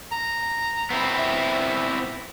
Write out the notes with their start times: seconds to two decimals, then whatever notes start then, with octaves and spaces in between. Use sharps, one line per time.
0.12 A#5
0.90 B3 C4 E4
1.18 E5